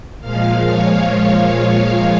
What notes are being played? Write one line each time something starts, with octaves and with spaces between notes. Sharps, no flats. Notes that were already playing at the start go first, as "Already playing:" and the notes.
A#2 F3 G#3 F5
C#5